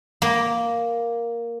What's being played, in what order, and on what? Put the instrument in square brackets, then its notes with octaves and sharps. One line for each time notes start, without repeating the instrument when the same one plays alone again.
[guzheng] A#3